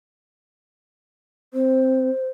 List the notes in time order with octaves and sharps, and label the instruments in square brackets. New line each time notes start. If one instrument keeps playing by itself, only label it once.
[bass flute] C4 [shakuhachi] C5